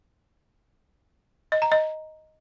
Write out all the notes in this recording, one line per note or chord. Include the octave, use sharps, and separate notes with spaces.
D#5
A#5
D#5